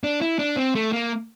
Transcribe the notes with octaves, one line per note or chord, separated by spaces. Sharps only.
D4
E4
D4
C4
A3
A#3